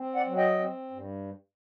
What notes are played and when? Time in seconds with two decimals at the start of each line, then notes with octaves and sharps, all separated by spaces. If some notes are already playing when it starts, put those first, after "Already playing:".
Already playing: C4
0.15 D5 F#5
0.26 F#3
0.37 D#5 G5
0.59 C4
0.91 G2